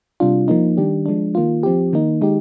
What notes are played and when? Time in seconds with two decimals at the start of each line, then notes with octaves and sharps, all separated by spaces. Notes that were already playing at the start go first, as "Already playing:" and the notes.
0.20 C3 G3 D4 F4
0.48 F3 A#3 D#4
0.77 D#3 G3 D4 G4
1.06 F3 G#3 D4
1.35 D#3 A#3 F4
1.63 F3 C4 G4
1.93 D#3 A#3 D#4
2.21 D#3 G#3 D#4 G4